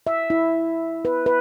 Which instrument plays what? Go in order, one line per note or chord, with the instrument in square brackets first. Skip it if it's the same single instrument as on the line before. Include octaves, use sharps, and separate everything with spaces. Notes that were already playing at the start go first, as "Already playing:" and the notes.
[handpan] E5
E4
B4
B4